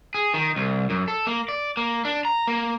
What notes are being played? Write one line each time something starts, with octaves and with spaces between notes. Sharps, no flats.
G#4
D#3
C2
F#2
A4
A#3
D5
A#3
D4
A#5
A#3